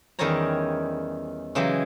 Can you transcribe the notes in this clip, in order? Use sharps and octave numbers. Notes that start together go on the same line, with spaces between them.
E2 D#3 G3 C#4 C#5 A#5
C#3 E3 F#3 G#3 G4